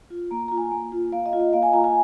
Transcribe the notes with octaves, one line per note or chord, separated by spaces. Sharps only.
F4
A#3 A#5
F4 A#5
G#5
A#3
F4
A#3 F5
D#5
F4
D#5
A#3 F5
G#5
F4 A#5
G#5